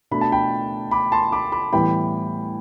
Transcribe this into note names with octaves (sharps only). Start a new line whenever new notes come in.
B2 A3 D4 B5
A5
G5 B5
B5 D6
A5 C6
B5 D6
B5 D6
A2 E3 G3 B3 G5 B5